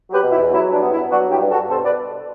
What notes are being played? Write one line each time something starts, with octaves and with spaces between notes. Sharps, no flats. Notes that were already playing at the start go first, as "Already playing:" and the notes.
F#3 G4 B4
B2
E4
E2
F#3 E4
G2
D4
B3
E4
B3
F#3 D4 F#4
G2 E4 G4
G2
F#4 A4
G2
B2 A4 C5
B2 B4 D5